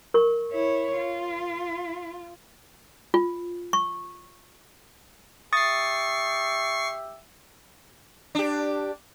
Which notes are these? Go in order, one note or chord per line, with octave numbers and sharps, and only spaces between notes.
A#4 C#6
E4 C#5
F4
F4
C#6
G4 E5 C#6 D#6 A6 C7
D4 G4